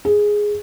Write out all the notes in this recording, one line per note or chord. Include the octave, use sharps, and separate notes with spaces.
G#4